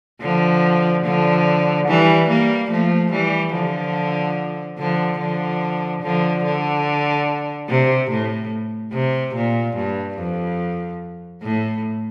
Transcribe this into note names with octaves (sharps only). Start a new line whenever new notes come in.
D3 F3
D3 F3
E3 G3
G3 A#3
F3 A3
E3 G3
D3 F3
D3 F3
D3 F3
D3 F3
D3
C3
A2
C3
A#2
G2
F2
A2